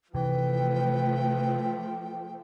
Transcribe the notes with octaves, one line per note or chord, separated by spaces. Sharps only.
C3 E3 F3 A3 B4 G5